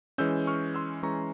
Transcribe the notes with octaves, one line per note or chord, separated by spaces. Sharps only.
E3 G#3 C#4 E6 G6
C#6 F6
C6 E6
E3 G#3 C#4 A#5 C#6